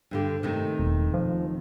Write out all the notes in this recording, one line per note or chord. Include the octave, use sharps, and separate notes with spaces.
G2 D3 G4
C3 D#3 A3
E1
F3